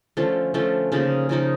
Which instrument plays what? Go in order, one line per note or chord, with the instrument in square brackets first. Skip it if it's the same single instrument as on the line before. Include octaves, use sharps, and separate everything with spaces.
[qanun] D3 F3 A3 C#4
D3 F3 A3 C#4
C#3 F3 A#3 D#4
C#3 F3 A#3 D#4